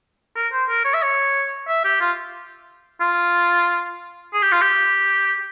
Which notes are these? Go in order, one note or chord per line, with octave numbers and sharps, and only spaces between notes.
A#4
C5
A#4
C#5
E5
C#5
E5
G4
F4
F4
G#4
G4
F4
G4